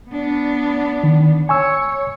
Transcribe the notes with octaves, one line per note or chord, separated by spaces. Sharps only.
B3 D4
D#3
C#5 G#5 C#6 E6